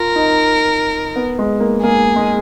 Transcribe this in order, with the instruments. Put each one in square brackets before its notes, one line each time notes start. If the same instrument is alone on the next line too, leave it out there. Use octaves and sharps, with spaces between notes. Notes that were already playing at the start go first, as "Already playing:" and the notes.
Already playing: [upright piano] F4 [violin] A#4
[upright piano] D#4
B3
G#3
A#3
[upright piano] A#3 [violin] G#4
[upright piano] G#3